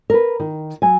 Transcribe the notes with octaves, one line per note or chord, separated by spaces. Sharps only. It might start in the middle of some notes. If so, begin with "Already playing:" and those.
A#4 B4
D#3
F#3 G#5